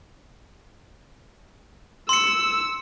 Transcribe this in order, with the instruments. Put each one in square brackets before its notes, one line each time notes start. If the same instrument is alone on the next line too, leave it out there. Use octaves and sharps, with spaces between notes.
[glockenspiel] C6 C#7 [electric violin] E6